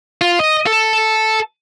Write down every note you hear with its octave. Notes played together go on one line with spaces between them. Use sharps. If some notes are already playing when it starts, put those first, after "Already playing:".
F4
D#5
A4